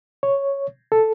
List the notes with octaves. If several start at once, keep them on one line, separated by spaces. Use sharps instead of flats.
C#5
A4